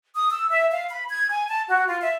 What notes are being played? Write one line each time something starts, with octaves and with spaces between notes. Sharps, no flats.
D#6
E6
E5
F5
B5
G#6
G#5
A5
F#4
F4
E5